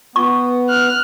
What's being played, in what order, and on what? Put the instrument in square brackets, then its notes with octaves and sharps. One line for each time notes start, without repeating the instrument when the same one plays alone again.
[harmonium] B3 [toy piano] C#6
[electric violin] F6 F#6